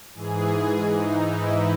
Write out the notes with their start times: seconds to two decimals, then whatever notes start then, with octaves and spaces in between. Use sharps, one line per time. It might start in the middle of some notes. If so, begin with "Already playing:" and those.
0.15 G#2 E3 G#4
0.83 G#2 E3 D#4
1.17 E4